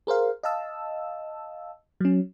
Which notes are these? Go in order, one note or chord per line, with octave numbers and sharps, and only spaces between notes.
G#4 A#4 C5 F5
D#5 F5 A5 E6
F#3 C#4